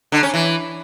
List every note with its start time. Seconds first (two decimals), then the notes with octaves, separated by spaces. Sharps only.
0.12 D3
0.23 C#4
0.34 E3